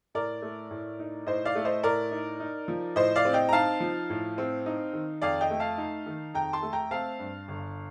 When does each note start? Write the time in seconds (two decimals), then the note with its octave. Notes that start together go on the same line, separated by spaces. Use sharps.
0.15 A2 A#4 D5
0.42 A3
0.71 A2
1.00 D#4
1.27 A2 C5 D#5
1.45 D5 F5
1.55 A3
1.65 C5 D#5
1.83 A2 A#4 D5
2.11 D#4
2.40 D#4
2.68 F3
2.96 A2 C5 D#5
3.16 D5 F5
3.25 C4
3.33 D#5 G5
3.49 A#5
3.53 D#4 F5 A5
3.80 F3
4.10 A2
4.38 C4
4.66 D#4
4.93 D#3
5.22 F2 D5 F5
5.41 D#5 G5
5.50 A3
5.60 F5 A5
5.78 D#4
6.06 D#3
6.34 F2 G5 A#5
6.53 A5 C6
6.62 A3
6.73 G5 A#5
6.91 C4 F5 A5
7.19 G2
7.48 G1